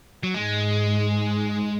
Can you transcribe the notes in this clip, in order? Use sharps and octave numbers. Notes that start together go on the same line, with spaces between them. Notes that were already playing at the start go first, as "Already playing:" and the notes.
F#3
G#2 G#3